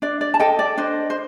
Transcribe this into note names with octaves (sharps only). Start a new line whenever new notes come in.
D4 D5
D5
A5
A4 D#5 G5
D5
D4 C5 D#5
C5